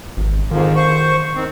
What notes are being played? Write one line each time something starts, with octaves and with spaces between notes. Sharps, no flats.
G#1
F2 G#2 D#3 F3
C5 C#6
D#3 C4